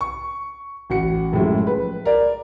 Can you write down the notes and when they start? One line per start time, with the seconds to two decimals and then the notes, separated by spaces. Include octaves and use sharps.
0.01 C#6
0.90 A1 F#4 C#7
1.32 F#2 A2 F3 G#3
1.67 B4
2.05 A#4 D5